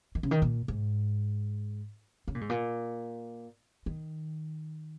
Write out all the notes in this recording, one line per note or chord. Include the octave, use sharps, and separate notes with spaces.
D#3
C#3
D#3
A#2
G#2
C#3
A#2
G#2
A#2
D#3